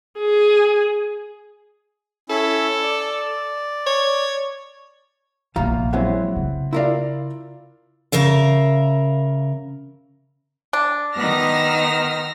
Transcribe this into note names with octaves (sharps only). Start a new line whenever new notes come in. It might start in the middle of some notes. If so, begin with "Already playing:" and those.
G#4
C#4 E4 A4 B5
D5
C#5
A#1 E2 F3 F4 A#5
F#3 G#3 C4 E4 F#5
C#3
E4 F4 A#4 D5 F5
C#3 A#4 E5 F5
D4
D#3 B3 E6 F6 A#6